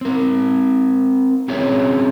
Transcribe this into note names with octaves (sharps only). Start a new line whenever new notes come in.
C4 A#4
C4 C#4 F4 G#4 C#5 E5